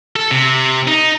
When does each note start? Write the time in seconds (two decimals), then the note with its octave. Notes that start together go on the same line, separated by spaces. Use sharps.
0.16 A4
0.31 C3
0.87 D#4